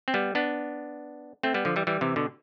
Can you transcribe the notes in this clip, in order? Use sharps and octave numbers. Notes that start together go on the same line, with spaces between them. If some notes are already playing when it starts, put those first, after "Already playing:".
C4
G3 B3
B3 D4
A3 C4
G3 B3
D3 F3
E3 G3
E3 G3
C3 E3
B2 D3